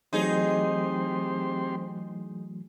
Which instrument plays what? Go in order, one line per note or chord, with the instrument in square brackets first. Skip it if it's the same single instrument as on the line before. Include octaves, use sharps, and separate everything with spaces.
[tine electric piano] E3 F#3 A3 [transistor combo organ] C4 G4 C6 [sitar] D#4 G#4